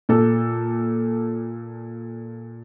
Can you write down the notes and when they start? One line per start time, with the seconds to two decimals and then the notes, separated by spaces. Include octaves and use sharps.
0.09 A#2 A4